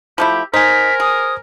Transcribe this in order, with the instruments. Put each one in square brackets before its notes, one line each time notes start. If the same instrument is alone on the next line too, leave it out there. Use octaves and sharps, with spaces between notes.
[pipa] F3 A3 E4 [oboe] G4
[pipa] D#4 [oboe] A#4 [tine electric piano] C5 G#5 [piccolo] B6
[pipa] G#4 [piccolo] D#6